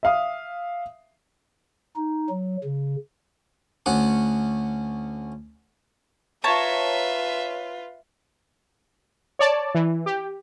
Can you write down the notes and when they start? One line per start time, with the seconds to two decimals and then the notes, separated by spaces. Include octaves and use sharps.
0.03 E5 F5 D#6
1.96 D#4
2.29 F#3
2.64 C#3
3.86 D2 C#4 F#5
6.44 F4 B4 C#5 E5 A5 A#5
9.39 C#5 D5 A5
9.75 E3
10.06 G4